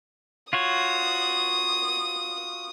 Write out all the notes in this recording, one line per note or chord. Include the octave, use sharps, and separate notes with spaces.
F4 F#4 C#5 D#6